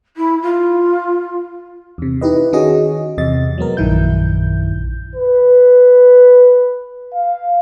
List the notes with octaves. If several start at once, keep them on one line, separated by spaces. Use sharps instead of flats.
E4
F4
E2 C3
D#4 E4 G4 B4 D#5
D#3 C#4 F#4 G#4 D#5
E2 C3 D#5 A6
F#3 G#3 B3 A#4
A#1 F#2 D#3 E4 G6
B4
F5